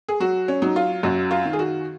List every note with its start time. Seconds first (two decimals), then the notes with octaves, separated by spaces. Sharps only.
0.08 G#4
0.20 F#3 F#4
0.48 C#4
0.62 F#3 D#4
0.76 F4
1.03 F#2 F#4
1.31 F4
1.45 D#3
1.53 G#4
1.59 F#4